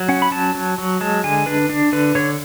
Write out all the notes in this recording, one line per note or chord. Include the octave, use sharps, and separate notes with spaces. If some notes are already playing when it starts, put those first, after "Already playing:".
Already playing: F#3
C#4 F#5
B5
F#3 A5
F#3
F#3
G#3 A5
D3 G#5
D4 B4
D4
D3 B4
D3 C#5